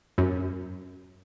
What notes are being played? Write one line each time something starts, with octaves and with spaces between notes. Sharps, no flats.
F#2